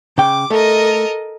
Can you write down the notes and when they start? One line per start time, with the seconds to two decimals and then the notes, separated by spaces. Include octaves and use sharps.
0.18 C#3 G5 D6
0.50 A3 A4 A#4 D#5